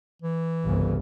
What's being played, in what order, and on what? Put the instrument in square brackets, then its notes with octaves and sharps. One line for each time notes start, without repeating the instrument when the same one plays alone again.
[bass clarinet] E3
[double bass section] G1 C2 C#3